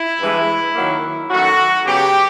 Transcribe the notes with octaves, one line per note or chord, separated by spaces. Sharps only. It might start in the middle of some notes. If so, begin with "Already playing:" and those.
Already playing: E4
G2 E3 G#3
D#3 F#3 A#3
D#3 F#3 A3 C#4 F#4
C#3 F#3 B3 G4